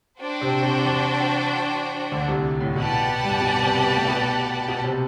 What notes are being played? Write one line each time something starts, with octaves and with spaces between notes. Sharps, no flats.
D4 F#4 C5 G5
C3 C4
C3 C4
E2 E3
D2 D3
C2 C3
A2
B2 G4 B4 D5 F#5 A5
B2
G2 G3
B2 B3
C3 C4
B3
A3
B2 B3
B2 B3
C3 C4